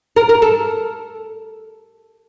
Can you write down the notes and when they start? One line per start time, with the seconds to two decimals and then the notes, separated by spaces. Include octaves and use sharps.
0.16 A#4
0.29 A#4
0.42 A4